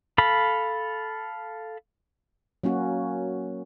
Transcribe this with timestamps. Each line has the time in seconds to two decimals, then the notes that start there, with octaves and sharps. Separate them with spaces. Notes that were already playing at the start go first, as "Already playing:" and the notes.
0.18 A4 F5 B5
2.64 F#3 A#3 C#4 F#4